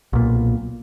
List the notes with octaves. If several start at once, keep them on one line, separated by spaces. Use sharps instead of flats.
B1 A#2